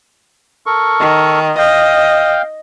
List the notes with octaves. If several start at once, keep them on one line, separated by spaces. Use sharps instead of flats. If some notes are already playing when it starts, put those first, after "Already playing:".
A4 A#4 C#6
D#3
D#5 F5 G5